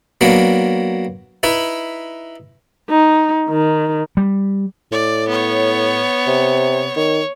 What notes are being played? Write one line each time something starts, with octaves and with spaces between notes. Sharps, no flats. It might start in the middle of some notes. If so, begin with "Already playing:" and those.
F#3 A#3 B3 D4
D#4 E4 B4
D#4
D#3
G3
A2 D5
B3 C#5
C3
D#3 C#5